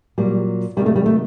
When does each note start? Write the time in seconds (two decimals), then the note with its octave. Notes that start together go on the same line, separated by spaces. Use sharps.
0.18 A#2 F#3 G3
0.76 C3 D#3 F#3 G3
0.86 A3
0.96 G3
1.06 A3